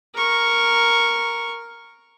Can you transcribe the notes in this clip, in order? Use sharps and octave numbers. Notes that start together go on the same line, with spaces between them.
A#4 C#6